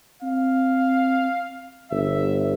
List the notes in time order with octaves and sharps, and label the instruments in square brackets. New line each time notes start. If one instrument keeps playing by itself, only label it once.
[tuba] C4 [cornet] F5
[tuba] G1 [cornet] E5